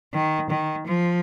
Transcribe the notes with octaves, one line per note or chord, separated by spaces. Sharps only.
D#3
D#3
F3